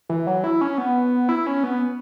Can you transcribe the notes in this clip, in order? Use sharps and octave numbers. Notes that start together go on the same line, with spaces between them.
E3
F#3
E4
C#4
B3
E4
C#4
B3